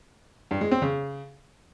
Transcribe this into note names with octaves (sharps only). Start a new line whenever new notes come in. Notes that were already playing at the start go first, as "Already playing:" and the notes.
G2
G#3
C4
C#3